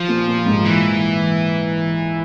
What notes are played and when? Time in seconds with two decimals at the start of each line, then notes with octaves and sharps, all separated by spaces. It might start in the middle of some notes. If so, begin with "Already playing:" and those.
Already playing: F3
0.08 A#2
0.27 A#2
0.46 G#2
0.65 E3